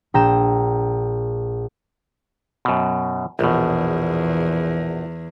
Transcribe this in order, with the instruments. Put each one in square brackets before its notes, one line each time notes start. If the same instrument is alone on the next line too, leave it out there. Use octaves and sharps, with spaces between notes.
[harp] A#1 G5 A#5 A#6 E7
[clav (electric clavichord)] F#2 B2
[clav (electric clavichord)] A#1 B2 [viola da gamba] E2